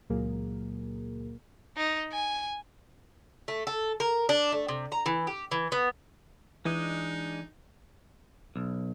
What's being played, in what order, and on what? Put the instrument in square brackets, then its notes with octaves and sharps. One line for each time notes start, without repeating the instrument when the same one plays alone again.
[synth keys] C#2 A#2 F#3 A#3 G#4 A#4
[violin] D#4
G#5
[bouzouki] A3
A4
A#4
D4
A3
C3
A#5
E3
G4
E3
B3
[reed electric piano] E3 [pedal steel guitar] G#3 D4 D#5 [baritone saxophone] D#4
[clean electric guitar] B1